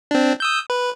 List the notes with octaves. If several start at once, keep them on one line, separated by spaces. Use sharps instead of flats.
C4 D4
D#6 E6 G6
B4